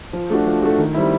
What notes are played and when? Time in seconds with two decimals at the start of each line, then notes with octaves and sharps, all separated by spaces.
0.13 F3
0.30 A3 D4 F#4
0.46 F3
0.62 A3 D4 F#4
0.78 D#3
0.94 G3 C4 E4